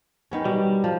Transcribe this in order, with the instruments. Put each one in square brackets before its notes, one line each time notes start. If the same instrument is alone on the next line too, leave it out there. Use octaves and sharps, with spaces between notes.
[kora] D#3 B3 C#4
[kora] B2 [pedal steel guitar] G3
[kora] F3